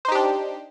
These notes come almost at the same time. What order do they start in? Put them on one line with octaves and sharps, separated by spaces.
C5 D#4 G4 D4